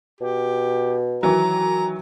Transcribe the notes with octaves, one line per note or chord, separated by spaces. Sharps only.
B2 G4
D#3 E3 F#3 A#5